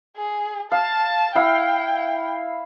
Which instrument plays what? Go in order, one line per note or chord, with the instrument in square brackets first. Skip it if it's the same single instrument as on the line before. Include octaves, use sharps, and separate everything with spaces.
[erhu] G#4
[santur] F5 [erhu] A5
[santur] E4 F5 [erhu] G5